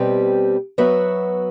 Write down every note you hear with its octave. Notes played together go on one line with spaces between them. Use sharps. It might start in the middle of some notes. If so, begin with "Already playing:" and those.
Already playing: B2 G3 C4 G4 B4
F#3 B3 F#4 B4 E5